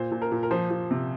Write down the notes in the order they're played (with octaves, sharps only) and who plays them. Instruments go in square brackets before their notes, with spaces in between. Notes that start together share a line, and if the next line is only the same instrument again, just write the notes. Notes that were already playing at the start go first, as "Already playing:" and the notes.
Already playing: [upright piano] A#2 C5
A#2
A#4
A#2
A#4
F3 C5
F3
C3